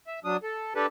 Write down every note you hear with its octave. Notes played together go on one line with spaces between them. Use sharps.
E5
F#3 D4 D#6
A4
D4 G4 A4 B4